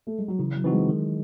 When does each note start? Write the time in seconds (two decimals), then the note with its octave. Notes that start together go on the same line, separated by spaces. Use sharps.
0.07 A3
0.18 G#3
0.28 F#3
0.39 C#3 E3
0.56 F#3
0.64 E3 C4 D#4 F#4
0.73 G#3
0.89 D#3